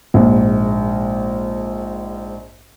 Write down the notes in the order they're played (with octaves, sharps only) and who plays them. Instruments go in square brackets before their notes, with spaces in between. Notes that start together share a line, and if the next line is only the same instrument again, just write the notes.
[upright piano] A#1 G#2